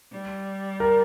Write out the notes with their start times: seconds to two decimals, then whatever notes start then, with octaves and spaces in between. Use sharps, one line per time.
0.12 G3
0.80 A#4